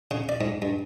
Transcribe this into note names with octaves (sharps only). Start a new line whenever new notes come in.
C#3
D5
G#2
G2